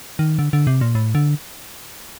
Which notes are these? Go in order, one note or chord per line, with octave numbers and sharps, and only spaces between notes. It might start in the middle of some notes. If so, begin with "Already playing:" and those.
D#3
D3
D3
C3
A#2
A2
D3